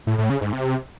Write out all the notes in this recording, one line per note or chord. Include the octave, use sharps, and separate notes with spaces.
A2
A2
C#3
G#2
C3